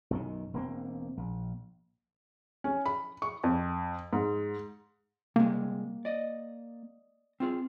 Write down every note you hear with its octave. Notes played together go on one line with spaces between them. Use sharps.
B1 F#2 D#3
E1 A#3 C4
A#1
C#4
B5
C#6
F2
G#2
C3 G3 G#3 A#3
D5 D#5
C4 F4 G#4